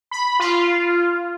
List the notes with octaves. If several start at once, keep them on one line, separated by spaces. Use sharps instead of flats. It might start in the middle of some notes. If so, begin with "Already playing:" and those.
B5
F4